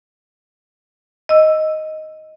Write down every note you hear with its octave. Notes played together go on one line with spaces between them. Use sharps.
D#5 E6